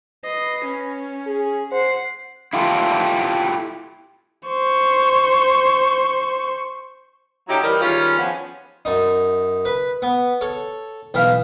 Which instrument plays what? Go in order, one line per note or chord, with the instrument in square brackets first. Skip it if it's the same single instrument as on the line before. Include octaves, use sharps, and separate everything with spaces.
[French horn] B4 [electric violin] D#5 C7
[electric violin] C#4
[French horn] G#4
[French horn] C5 [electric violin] F#5 C7
[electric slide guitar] E4 F4 G4 A4
[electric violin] C5 C#6
[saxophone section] D3 F#3 C#4 D#4 E4 G4
E3 G3 D#4 G4 A#4 D5
D#3 G3 G#3 C#4 F4
F3 B3 C#4
[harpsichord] F#2 D#4
B4 B5
B3
A4 C#5
B1 E3 E5 F5